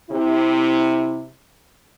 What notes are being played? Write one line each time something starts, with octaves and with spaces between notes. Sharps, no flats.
C3 E4